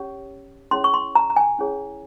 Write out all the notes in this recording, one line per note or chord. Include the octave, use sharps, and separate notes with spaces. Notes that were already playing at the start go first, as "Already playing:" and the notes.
Already playing: C#4 G4 C#5
C#4 E4 G#4 C#5 C6
C#6
C6
A#5
A#5
G#5
C#4 E4 G#4 C#5